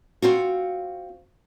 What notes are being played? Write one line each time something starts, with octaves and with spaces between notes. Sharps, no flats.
C4 F4 F#4